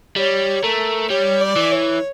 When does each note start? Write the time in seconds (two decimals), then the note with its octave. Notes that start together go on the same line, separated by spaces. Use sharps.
0.16 G3 C#5
0.63 A3 A#4
1.10 G3 C#5
1.41 D5
1.56 E3
1.72 C#5